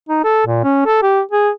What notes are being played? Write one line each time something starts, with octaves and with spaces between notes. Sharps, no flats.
D#4
A4
A#2
C#4
A4
G4
G#4